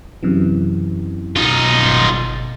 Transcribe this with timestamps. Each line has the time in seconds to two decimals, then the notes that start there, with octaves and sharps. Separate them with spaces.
0.23 F#2 C3 E3
1.36 B1 D#4 F4
1.81 G1 A6